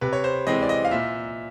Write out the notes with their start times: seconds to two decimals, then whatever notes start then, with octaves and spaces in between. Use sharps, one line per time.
0.01 C3 B4
0.13 C#5
0.24 C5
0.47 E3 G#3 C4 D#5
0.63 D5
0.69 D#5
0.85 F5
0.91 A#2 E5